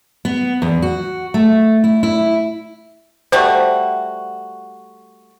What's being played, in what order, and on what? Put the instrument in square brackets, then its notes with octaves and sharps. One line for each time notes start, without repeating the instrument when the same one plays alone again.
[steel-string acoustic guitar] B3
E2
F#4
A3
E4
E4
[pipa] G3 A3 F#4 [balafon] C5